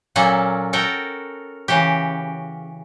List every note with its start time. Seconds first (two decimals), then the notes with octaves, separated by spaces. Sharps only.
0.15 A#2 F#3 A#3 C#4 A4
0.73 F#4 A4 A#4 G5 A5
1.68 C#3 E3 F#4 G4